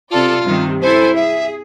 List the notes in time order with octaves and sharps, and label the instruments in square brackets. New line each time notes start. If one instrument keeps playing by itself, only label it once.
[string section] C3 A4 D5 [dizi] F4
[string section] G2 C3 D#3
[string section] E4 A4 G#5 [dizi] C5
[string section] G#4 [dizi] E5